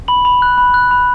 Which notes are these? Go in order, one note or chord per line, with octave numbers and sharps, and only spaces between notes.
B5 F#7
B5
F#6
B5
F#6
B5